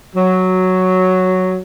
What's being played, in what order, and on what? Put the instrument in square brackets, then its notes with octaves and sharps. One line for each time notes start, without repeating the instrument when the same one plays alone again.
[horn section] F#3